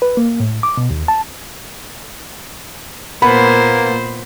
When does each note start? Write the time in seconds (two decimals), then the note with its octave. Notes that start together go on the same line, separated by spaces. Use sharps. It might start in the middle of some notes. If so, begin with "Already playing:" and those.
0.02 B4
0.17 A#3
0.40 A2
0.63 D6
0.77 B2
0.91 D#2
1.08 A5
3.22 A#2 A#3 B3 C5 B5